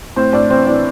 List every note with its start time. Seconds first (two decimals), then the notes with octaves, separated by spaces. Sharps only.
0.16 A2 C4 C5
0.33 A2 D4 D5
0.50 E3 C4 C5
0.67 E3 D4 D5